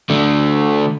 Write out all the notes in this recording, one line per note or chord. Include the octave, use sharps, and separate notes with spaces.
D3 A3